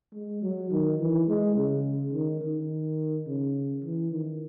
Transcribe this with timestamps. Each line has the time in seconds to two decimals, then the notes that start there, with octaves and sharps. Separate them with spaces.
0.14 G#3
0.42 F#3
0.71 D#3
0.99 E3
1.28 G#3
1.56 C#3
2.13 D#3
2.41 D#3
3.27 C#3
3.84 E3
4.12 D#3